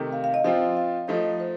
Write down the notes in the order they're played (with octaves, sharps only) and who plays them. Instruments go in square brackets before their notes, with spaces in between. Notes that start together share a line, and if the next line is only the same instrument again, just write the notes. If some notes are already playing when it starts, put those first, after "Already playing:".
Already playing: [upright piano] C3 D#3 A3
[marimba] F5
F5
D#5
[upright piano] F3 C4 F4 [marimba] F5
[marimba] F5
[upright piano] F3 A3 D#4 [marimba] D#5
[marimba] C5